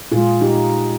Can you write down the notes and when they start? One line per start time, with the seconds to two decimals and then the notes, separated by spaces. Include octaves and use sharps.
0.12 A#2 G#3 F4 G#4
0.41 D#4 G4